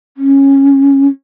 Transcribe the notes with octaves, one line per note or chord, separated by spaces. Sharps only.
C#4